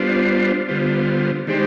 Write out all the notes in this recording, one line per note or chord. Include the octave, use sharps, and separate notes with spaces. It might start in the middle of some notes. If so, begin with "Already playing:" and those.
Already playing: G3 B3 D4 F4 C5
D3 G3 B3 F4 C5
D#3 G#3 D4 G4 C5